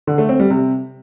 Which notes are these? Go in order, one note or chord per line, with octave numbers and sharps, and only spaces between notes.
D3
A3
C4
G3
C3